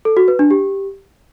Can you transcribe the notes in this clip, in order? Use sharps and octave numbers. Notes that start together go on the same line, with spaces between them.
A4
F#4
B4
D4
G4